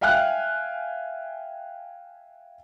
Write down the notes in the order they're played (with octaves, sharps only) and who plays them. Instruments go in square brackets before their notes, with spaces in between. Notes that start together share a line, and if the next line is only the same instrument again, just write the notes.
[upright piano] E5 F5 G5 G#5 F6 F#6